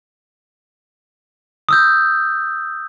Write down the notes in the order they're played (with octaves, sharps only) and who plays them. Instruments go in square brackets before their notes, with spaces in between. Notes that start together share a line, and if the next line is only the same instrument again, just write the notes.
[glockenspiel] D#6 E6 G6